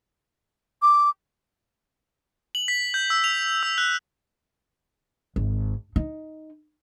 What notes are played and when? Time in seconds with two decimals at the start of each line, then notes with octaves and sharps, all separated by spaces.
0.82 D6
2.55 F#7
2.68 B6
2.94 G6
3.10 E6
3.24 F7
3.63 E6
3.78 F#6
5.36 G#1
5.96 D#4